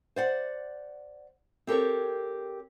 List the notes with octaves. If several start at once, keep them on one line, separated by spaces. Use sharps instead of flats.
C5 D5 F#5
C4 G4 A4 A#4 C#5